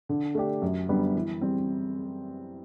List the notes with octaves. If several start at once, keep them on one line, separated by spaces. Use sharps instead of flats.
D3
A3 D4 G4
F#2
D3 G3 B3
E3
G3 C4